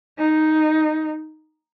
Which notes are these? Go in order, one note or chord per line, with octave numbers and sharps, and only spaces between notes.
D#4